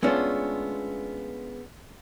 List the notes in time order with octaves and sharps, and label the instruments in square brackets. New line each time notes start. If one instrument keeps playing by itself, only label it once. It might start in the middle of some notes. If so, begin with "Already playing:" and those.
[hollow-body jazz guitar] G#3 A3 B3 C#4 D4 F4